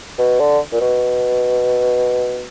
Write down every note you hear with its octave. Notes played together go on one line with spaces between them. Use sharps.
B2
D3
A#2
B2